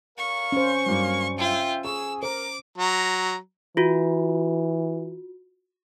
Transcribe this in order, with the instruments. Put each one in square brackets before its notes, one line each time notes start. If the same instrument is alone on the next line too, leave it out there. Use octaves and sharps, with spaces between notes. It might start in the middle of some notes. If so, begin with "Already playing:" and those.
[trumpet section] A#4 C#5 F5 [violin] C#6
[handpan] C#4 C5
[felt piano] G2 F#3 [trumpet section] A#3 F5
[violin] F4 [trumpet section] E5 G5
[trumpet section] G#4 [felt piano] C#6 [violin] E6
[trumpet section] A#4 [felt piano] C5 [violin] D6
[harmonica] F#3 A#5
[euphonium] E3 [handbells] F4 F#4